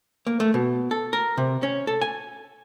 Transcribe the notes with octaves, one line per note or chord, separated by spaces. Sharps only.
A#3
A3
B2
A4
A#4
C3
C#4
A4
G#5